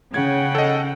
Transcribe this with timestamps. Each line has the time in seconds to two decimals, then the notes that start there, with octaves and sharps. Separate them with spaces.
0.14 C#3 F#5 G5 G#6
0.55 A4 D#5